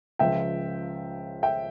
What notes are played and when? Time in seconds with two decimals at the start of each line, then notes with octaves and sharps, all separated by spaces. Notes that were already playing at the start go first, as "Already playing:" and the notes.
0.19 C#2 C#3 F3 E5 G5
1.43 E5 G5